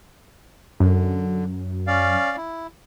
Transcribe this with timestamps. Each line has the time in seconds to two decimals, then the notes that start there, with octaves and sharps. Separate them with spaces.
0.80 F#2 D3
1.87 C#4 D5 F5
2.37 E4